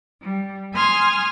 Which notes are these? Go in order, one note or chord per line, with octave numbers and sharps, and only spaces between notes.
G3
G#5 C6 D#6 F6 G#6